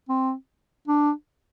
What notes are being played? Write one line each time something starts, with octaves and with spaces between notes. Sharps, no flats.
C4
D4